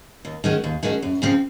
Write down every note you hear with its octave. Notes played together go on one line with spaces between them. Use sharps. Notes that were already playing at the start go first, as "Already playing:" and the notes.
D#2
D#3 G#3 C#4 F#4
D#2
D#3 G#3 C#4 F#4
F#2
C#3 F3 C4